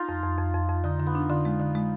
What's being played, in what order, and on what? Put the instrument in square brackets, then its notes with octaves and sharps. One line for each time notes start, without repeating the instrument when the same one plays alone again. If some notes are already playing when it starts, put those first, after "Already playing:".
Already playing: [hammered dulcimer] D#4 F4
[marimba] F2
F2
F2
F2
F2
[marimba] D3 [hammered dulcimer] D#4
[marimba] D3
[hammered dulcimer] B3
[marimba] D4
[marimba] D3 [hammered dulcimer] F4
[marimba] G#3
D3
G#3